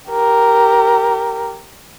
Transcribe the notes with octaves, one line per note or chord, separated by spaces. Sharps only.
G4 A#4